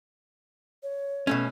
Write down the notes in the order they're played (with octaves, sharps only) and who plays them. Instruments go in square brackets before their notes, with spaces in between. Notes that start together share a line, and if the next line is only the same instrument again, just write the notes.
[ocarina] C#5
[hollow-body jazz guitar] B2 A3 C#4